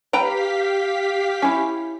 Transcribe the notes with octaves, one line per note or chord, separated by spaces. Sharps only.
G4 B4 F5 G5 A#5 B6
C#4 E4